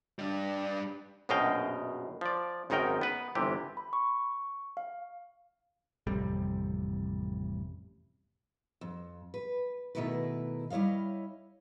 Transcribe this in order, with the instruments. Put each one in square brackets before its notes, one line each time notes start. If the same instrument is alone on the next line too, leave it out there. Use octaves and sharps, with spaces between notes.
[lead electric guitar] G3 D4
[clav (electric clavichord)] A#1 F#2 B2 D#5 F5 G5
F3 D5
G#1 F#2 D#3 D#4 A#4 G5
B3 B4
G1 C3 E3 G4
[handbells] B5
C#6
F5
[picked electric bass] A1 F2 C3 G3
[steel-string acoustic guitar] F2
B4
B2 D#3 A3 E4 A#4 B4
G3 E4 C#5 D#5 F5